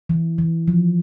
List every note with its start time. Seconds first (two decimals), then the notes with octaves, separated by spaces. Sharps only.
0.09 E3
0.38 E3
0.68 F3